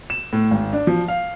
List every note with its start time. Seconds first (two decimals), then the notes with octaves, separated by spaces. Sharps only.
0.10 E7
0.33 A2
0.51 G#1
0.73 D4
0.87 F3
1.08 F5